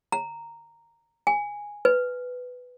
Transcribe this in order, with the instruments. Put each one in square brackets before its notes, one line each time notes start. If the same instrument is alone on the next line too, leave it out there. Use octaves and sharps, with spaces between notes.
[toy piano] A#5
G#5
B4